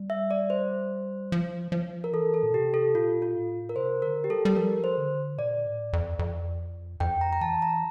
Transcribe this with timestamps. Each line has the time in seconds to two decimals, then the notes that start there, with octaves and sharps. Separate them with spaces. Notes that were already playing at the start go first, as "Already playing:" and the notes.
Already playing: G3
0.10 E5
0.31 D5
0.50 C5
1.32 F3
1.72 F3
2.04 A#4
2.13 E3 A4
2.34 A4
2.43 A#2
2.53 C3 G4
2.74 A4
2.95 A#2 F4
3.22 F4
3.34 A2
3.69 A#4
3.76 C3 C5
4.02 D3 A#4
4.24 G4
4.29 G3 A4
4.45 G3
4.57 F3 A#4
4.84 C5
4.98 D3
5.38 A#2 D5
5.66 A2
5.93 F2
6.19 F2
7.00 F2 G5
7.21 A#5
7.33 A#5
7.41 E3 A5
7.62 A#5